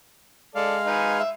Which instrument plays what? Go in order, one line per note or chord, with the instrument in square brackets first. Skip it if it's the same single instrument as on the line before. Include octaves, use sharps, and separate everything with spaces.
[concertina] G#3 F5 [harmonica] A4 D5
[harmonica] D#4 B4 G#5
E5